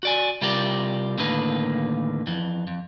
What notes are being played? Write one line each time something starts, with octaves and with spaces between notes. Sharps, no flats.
F#4 D5 G#5
C3 G3 F4 G4 A#4 D5
D#2 A2 D3 D#3 A#3 B4
F2 E3
F2